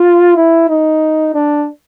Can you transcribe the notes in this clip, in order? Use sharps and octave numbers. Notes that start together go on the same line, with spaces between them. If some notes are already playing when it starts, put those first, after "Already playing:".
Already playing: F4
E4
D#4
D4